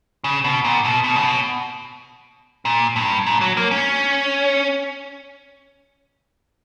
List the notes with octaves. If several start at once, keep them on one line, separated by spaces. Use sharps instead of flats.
C#3
B2
A#2
B2
B2
C#3
B2
A#2
G2
A#2
F#3
A#3
C#4